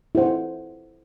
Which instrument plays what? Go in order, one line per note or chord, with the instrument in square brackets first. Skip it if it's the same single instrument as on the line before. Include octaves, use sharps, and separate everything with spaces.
[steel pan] E4 A4 C5 F#5